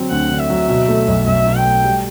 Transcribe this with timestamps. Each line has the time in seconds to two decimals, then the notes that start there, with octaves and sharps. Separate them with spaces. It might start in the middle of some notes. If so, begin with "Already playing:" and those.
Already playing: D3 F#3 C4
0.11 D2 F#5
0.31 D3
0.40 E5
0.50 F#3
0.69 B2
0.88 A3
1.08 B1
1.27 B1 E5
1.46 B2
1.55 G5
1.65 A3
1.85 G3